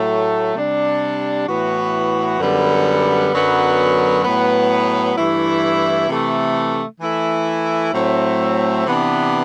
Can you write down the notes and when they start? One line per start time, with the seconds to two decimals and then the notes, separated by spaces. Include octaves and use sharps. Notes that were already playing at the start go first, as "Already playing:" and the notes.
Already playing: A2 F#3 A3
0.56 C3 G3 D4
1.48 A2 E3 B3 F#4
2.40 F#2 D3 G3 B3
3.33 F#2 D3 F#3 B3
4.24 A2 F#3 B3
5.16 G2 E3 A3 E4
6.09 C3 E3 A3
7.01 E3 A3 E4
7.93 A2 F#3 A3 C4
8.86 C3 E3 B3 D4